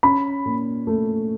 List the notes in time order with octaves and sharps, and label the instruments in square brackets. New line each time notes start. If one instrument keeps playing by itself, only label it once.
[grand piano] C#4 [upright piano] B5
[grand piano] A#2
A3